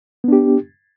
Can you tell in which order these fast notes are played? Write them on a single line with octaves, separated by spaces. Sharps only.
B3 D4 G4